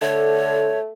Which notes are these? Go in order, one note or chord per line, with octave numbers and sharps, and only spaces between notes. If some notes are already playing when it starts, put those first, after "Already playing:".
D3 A3 C#5